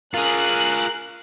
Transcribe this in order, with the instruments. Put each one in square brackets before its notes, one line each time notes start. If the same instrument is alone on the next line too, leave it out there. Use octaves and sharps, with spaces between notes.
[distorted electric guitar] F4 G#4 [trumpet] A#4 [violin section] F#6